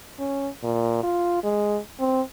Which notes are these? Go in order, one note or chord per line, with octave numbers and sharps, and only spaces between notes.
C#4
A#2
F4
G#3
C4